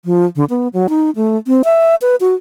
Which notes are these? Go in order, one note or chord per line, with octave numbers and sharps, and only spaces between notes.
F3
D3
B3
F#3
D#4
A3
C4
E5
B4
F#4